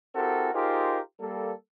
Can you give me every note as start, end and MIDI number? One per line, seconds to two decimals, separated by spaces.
0.15 0.53 60
0.15 0.53 64
0.15 0.53 66
0.15 0.53 67
0.15 0.53 69
0.15 0.53 70
0.54 0.99 63
0.54 0.99 65
0.54 0.99 67
0.54 0.99 68
0.54 0.99 70
0.54 0.99 72
1.21 1.53 55
1.21 1.53 58
1.21 1.53 69